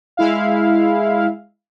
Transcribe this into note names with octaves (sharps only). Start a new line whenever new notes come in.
G#3 E4 F5